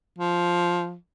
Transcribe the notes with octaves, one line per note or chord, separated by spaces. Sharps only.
F3